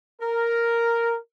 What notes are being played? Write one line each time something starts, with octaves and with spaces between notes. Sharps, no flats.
A#4